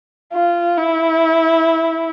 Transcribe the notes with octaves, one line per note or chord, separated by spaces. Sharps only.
F4
E4